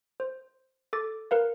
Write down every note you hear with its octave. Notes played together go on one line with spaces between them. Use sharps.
C5
A4 D6 A6
A#4 B4 F5